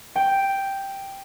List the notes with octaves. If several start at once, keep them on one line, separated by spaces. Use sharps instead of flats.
G5